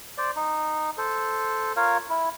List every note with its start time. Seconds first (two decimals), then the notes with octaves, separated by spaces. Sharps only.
0.18 C5 D5
0.36 D#4
0.98 A4 C5
1.76 F4 A#4 C#5 F5
2.09 E4